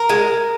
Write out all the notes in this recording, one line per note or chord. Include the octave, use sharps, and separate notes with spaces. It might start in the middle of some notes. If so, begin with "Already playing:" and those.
Already playing: A#4
G#3